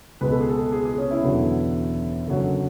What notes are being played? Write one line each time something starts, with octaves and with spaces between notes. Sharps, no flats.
C#2 B2 G#3 B4
A4
G#4
A4
G#4
G#4
C#4
E4
E1 E2 D3 F#3
F#1 F#2 D3 F#3